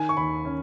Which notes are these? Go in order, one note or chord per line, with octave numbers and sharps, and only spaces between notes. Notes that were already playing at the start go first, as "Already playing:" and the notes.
Already playing: D#3 G#5
C#6
D#2 B5
C#4